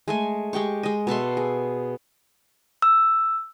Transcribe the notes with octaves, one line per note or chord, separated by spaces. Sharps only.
G#3 A3 G#5
G#3 G4 G5 C#6
G#3 D#5
B2 A4 E5 C6
G#4
E6